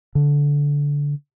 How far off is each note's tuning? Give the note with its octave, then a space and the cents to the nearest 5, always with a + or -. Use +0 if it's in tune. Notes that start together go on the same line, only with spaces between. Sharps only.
D3 -20